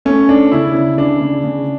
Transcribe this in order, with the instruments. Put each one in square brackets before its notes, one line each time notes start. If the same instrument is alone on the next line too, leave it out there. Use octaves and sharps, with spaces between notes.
[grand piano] A3 C#4
A3 D4
C#3 E4
C#3
C#3 D4
C#3
C#3